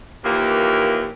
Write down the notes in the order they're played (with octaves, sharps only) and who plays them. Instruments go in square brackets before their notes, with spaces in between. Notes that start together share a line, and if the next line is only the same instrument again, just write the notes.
[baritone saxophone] D#2 [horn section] A#2 E3 A#3